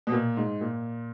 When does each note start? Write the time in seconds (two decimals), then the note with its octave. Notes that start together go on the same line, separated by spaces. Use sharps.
0.07 B2
0.12 A#2
0.37 G#2
0.61 A#2